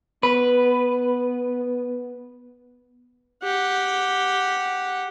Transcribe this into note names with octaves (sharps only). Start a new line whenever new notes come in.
B3 B4
G4 F#5